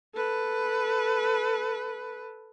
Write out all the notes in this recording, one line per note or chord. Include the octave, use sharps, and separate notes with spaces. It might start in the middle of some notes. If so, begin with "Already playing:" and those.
A4 B4